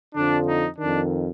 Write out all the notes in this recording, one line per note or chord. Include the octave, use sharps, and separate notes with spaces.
F2 D3 F3 D4
D#4
F2 D#3 D4